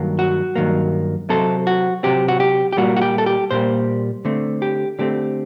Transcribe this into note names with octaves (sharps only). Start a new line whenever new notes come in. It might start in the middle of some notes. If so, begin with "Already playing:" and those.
Already playing: G2 D#3 F#3 A#3
F#4
G2 D#3 F#3 A#3
C3 F#3 C4 A4
F#4
C3 F#3 C4 G4
F#4
G4
G4
A#2 G3 A#3 F#4
F#4
G4
A4
G4
A#2 G3 A#3 C5
D3 A3 C4
G4
D3 A3 C4 G4